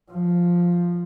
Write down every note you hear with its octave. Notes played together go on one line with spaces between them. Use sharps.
F3